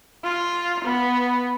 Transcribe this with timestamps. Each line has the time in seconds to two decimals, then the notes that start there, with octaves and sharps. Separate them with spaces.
0.24 F4
0.84 B3